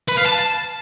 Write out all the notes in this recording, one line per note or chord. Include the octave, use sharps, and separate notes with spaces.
B4
F5
A5